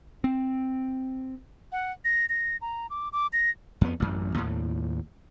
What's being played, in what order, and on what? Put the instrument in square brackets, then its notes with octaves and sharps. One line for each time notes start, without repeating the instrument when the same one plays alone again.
[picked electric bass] C4
[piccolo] F#5
A#6
A#6
A#5
D6
D6
A#6
[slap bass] F2 B3
A1 F#2
D#2 A2